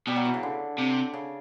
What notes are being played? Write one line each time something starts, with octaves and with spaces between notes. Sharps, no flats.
B2 G3
F#3
E3
C#3
D3
C3
C#3